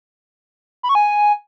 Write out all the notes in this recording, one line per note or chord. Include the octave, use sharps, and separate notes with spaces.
B5
C#6
G#5